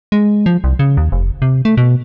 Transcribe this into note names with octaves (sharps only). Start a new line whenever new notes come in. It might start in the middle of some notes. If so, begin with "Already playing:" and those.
G#3
F3
C2
C#3
D#2
F1
C3
A3
B2